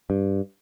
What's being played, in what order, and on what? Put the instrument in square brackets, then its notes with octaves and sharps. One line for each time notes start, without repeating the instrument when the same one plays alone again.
[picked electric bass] G2